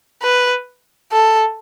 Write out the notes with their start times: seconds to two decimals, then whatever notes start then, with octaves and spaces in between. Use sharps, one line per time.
0.23 B4
1.12 A4